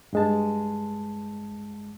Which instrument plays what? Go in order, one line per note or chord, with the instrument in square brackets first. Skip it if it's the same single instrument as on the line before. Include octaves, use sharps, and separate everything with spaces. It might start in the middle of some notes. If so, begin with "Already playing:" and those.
[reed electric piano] G2 G#3 A5